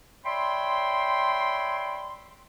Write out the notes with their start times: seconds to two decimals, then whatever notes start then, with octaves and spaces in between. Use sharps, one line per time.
0.25 C#5 D5 E5 G5 B5 C6